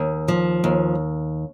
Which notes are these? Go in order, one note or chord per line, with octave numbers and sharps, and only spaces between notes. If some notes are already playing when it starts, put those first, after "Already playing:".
Already playing: D#2
F3
D#2